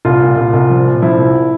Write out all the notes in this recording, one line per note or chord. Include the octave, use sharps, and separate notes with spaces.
C2 F4
A#2
C2
C2
F3
A#2
F3 E4
C2